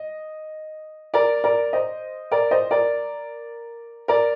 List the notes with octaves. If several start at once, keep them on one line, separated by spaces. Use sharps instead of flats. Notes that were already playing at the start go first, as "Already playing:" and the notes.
Already playing: D#5
A#4 D5
A#4 D5
C5 D#5
A#4 D5
C5 D#5
A#4 D5
A#4 D5